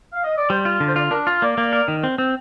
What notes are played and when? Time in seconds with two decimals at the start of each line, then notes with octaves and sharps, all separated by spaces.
0.12 F5
0.24 D#5
0.38 D5
0.50 G3 C5
0.65 F4
0.80 D3
0.87 C5
0.96 F4 D5
1.11 D4 A#4
1.27 F4
1.42 A#3 D5
1.58 A#3
1.73 A#4
1.88 D#3
2.04 C4
2.18 C4